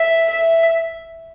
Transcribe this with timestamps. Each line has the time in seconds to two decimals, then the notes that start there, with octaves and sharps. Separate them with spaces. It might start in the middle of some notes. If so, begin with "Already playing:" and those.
Already playing: E5
0.29 E5